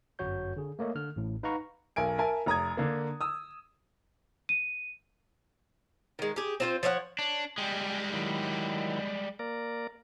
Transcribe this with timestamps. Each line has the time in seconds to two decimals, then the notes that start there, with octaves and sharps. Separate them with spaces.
0.19 G1 F#2 F#4 C#5 G6
0.57 D3 G#4
0.79 A3 A#3 C#5 D#5 E5
0.95 D3 F6
1.16 A1 A2
1.43 D#4 B4 F5 F#5 A#5 C#6
1.96 B1 A#4 G#5 D7
2.18 A#4 E5 G#5 A5
2.46 F1 A#5 D#6 G#6
2.77 D3 A#3
3.21 D#6 E6
4.49 D#7
6.19 D#3 G#3
6.36 G4 G#4
6.60 C4 F4 C5
6.83 F3 C#5 E5 F#5
7.19 D4 C#5
7.58 G3 G#3 G5 G#5
8.14 D#3 F#3 E4
9.39 A#3 A#4 D5